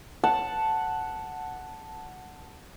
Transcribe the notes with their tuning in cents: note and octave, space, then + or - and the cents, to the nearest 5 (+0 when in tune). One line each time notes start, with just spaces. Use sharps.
F#5 +0 A5 +0